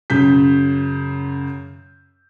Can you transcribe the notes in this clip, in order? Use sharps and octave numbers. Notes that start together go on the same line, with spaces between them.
F#2 C#3 G6 B6